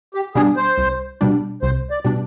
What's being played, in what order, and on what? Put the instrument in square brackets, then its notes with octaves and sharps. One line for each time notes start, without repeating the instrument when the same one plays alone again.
[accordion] G4
[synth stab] B2 G3 D4 [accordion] G#4
[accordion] C5
[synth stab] C2
B2 G3 D4
[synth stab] C2 [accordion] C5
[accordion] D5
[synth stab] B2 G3 D4